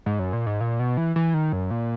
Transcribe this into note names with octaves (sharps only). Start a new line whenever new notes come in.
G#2
F#2
A#2
G#2
A#2
B2
E3
E3
D#3
F#2
A#2